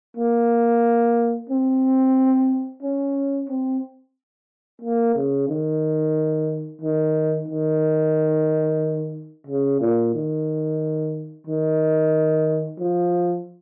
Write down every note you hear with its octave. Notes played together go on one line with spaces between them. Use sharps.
A#3
C4
C#4
C4
A#3
C#3
D#3
D#3
D#3
C#3
A#2
D#3
D#3
F3